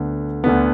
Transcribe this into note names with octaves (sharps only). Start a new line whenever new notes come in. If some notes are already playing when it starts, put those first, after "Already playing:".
Already playing: D2 D3 B3
D2 D3 B3